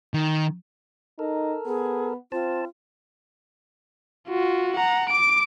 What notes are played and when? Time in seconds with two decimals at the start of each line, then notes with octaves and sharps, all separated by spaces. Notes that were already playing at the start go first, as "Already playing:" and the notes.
0.14 D#3
1.19 D#4 A4 A#4
1.66 B3 G#4
2.32 C4 F4 C5 A5
4.28 F4 F#4
4.77 F#5 A#5
5.09 D6 D7